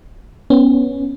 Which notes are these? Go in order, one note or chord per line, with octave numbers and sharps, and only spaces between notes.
B3 C#4